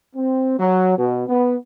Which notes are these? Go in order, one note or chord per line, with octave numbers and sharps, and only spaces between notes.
C4
F#3
B2
B3